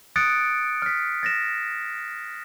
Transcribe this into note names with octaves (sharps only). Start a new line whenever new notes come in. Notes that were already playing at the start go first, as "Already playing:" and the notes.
D#6 F#6 A6 C#7 D7
F6 B6
A6 A#6 E7